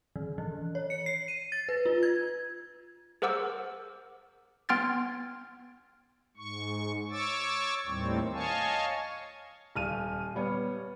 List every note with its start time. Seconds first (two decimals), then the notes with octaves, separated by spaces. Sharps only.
0.16 D#3
0.38 E3
0.75 C#5
0.90 C#7
1.06 C7
1.28 D#7
1.52 A6
1.69 B4
1.86 F4
2.03 G#6
3.22 G#4 A#4 C5 F#5 D6 E6
4.69 B3 G5 C6 F6 G#6 A6
6.37 G#2 C#6
7.11 C#5 C#6 D6 E6 A6
7.86 D#2 A2 D#3 G3 C4
8.33 C#5 D#5 F5 G#5 A5 C#6
9.76 D#1 F6 D#7
10.35 G3 B3 C#5